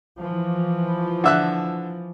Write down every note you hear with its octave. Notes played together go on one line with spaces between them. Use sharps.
E3 F3
D3 E5 F#6